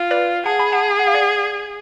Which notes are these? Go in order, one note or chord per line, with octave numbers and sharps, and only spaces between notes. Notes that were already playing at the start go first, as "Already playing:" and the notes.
Already playing: F4
B4 D5
G#4 F#5 A5
G#5 B5
F#5 A5
F#5
F5
D5 F#5